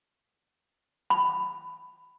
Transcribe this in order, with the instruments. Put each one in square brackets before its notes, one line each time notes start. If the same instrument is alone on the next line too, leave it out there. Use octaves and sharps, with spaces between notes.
[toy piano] B5